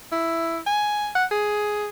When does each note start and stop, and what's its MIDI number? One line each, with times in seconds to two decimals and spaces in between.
0.12 0.58 64
0.66 1.10 80
1.15 1.25 78
1.31 1.89 68